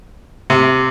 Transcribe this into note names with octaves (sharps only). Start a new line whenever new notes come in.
C3